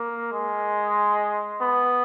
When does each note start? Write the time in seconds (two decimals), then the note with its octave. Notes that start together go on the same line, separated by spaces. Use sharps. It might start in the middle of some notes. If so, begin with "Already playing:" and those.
Already playing: A#3
0.33 G#3
1.62 B3